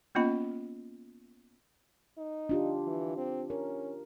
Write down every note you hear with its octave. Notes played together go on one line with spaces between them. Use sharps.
A#3 B3 C#4 F4 D#5 B5
D#4
D4 F4 G4
E3
C4
C#4 A#4